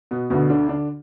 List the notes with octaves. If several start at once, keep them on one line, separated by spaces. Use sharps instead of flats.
B2 B3
D2 B2 D3 B3
D3 D4
D3 D4